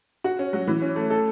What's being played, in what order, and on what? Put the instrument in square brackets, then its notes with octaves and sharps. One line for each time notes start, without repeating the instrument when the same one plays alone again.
[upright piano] F#4
C#4
F#3
E3
C#4
A3
A4